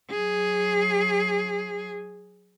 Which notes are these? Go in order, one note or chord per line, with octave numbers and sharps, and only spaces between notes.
F#3 G#4